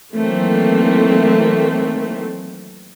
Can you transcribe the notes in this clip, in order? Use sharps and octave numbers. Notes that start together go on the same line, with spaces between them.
D#3 E3 F#3 A3 A#3 C4